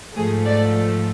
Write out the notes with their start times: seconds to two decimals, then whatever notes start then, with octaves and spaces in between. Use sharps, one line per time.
0.16 G#2 F3 A3 G#4
0.46 D5